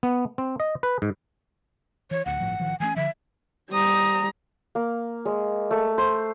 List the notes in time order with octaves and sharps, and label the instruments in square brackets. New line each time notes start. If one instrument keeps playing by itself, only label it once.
[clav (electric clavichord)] B3
C4
D#5
B4
G#2
[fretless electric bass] E3 [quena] C#5
[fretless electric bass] D1 D2 [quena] F#5
[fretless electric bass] G1 A2 F3
A1 D#3 F3
[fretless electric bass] E3 A3 C#4 [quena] G#5
[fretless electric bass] D3 F3 [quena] E5
[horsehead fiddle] G3 A#5 [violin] C5 D#6
[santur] A#3
G#3
A3
C5